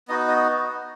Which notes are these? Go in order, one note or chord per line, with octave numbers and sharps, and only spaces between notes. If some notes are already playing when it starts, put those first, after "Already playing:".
B3 D#4 F#4 D#5
D#5